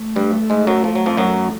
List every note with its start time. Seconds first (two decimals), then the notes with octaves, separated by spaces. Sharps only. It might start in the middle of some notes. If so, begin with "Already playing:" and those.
Already playing: A3
0.16 G2 G3
0.50 G#2 G#3
0.67 F#2 F#3
0.84 F3
0.95 F#3
1.06 F2 F3
1.17 F#2 F#3